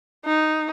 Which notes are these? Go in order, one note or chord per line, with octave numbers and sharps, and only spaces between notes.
D#4